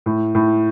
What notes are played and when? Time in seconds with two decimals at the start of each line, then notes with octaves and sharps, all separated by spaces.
0.06 A2
0.35 A2